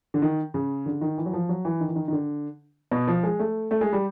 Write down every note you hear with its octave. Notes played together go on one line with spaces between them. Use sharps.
D3
D#3
C#3
D3
D#3
E3
F#3
F3
F#3
E3
D#3
E3
D#3
D#3
D3
B2
F3
G#3
A3
A3
G#3
G3